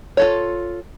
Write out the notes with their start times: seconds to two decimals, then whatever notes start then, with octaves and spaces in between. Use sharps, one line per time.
0.17 F4 A4 C#5